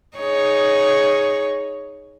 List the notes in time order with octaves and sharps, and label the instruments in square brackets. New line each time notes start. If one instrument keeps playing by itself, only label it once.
[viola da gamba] D#4 G#4 C#5